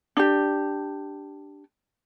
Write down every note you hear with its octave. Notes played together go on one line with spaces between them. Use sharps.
D4 G4